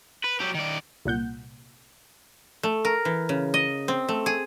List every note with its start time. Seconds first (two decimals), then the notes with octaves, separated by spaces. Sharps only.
0.24 B4
0.40 F#3 G4
0.54 D#3 D5
1.05 C2 A#2 F#5 G6
2.63 A3
2.85 A#4
3.05 E3
3.29 C#3
3.54 D#5
3.88 C4
4.09 A3
4.26 G#4